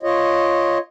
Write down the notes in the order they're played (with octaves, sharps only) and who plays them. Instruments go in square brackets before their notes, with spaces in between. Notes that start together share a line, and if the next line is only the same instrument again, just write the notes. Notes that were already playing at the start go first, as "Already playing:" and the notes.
[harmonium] F4 C#5 D#5